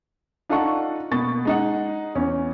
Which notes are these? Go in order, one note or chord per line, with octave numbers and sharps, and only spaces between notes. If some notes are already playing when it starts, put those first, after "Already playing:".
D4 D#4 F4 A4 F#5 C#6
B2 A#3 C#6 A6
G#3 D#4 F#5
E2 C#4